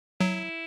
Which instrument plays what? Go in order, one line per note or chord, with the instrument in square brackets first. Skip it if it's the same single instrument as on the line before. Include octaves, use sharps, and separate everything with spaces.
[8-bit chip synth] F#3 [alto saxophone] E4